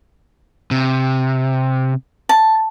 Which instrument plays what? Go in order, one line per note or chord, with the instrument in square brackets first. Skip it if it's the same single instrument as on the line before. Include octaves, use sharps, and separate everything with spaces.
[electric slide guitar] C3
[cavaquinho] A5